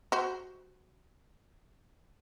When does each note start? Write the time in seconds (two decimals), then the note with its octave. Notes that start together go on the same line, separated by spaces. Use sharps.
0.12 F#4 C5